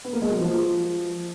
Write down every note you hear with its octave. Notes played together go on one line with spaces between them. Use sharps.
B3
A#3
G#3
F#3
F3